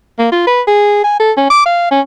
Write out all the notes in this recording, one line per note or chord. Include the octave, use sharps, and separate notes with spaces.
A#3
F4
B4
G#4
G#5
A4
C#4
D6
F5
C#4